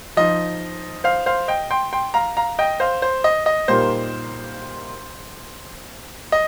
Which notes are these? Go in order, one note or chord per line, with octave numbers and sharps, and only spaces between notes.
F3 D#4 D#5
C5 F5
C5 F5
D#5 G5
G5 C6
G5 C6
F5 A#5
F5 A#5
D#5 G5
C5 F5
C5
D#5
D#5
A#2 G3 A#3 D#4 C5
D#5